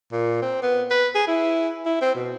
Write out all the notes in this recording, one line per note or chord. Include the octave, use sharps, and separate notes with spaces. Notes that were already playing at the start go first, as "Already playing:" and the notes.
A#2
C4
B3
B4
G#4
E4
E4
C4
B2